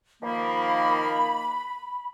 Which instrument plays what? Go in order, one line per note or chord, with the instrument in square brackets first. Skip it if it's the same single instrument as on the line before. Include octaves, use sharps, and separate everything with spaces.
[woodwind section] D#3 F3 A#3 [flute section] B5